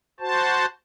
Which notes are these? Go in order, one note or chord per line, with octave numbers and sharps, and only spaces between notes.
F#4 C5 A5